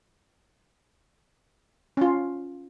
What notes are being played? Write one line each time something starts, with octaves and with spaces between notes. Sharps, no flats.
C#4 F4